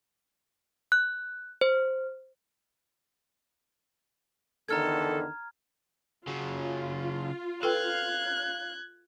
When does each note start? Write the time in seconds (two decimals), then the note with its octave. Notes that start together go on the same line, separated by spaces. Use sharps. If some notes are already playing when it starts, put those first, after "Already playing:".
0.92 F#6
1.61 C5
4.69 E2 D3 D#3 A4 A#5 F6 G#6
6.27 C#3 F#3 F4
7.63 A4 B4 F5 G5 F#6 G#6